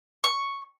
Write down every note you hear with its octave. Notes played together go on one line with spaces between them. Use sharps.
C#6